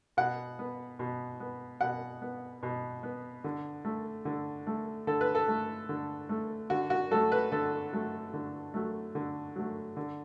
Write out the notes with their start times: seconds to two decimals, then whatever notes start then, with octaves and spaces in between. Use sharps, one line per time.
0.17 B2 F#5
0.59 B3
0.99 B2
1.40 B3
1.81 B2 F#5
2.22 B3
2.63 B2
3.03 B3
3.44 D3
3.85 A3
4.25 D3
4.67 A3
5.07 D3 A4
5.21 B4
5.35 A4
5.48 A3
5.89 D3
6.29 A3
6.70 D3 F#4
6.90 F#4
7.11 F#3 A3 A4
7.32 B4
7.52 D3 A4
7.93 F#3 A3
8.34 D3
8.74 F#3 A3
9.15 D3
9.56 F#3 A3
9.97 D3